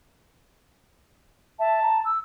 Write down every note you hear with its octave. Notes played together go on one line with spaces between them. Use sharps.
E5 A5
A#5
E6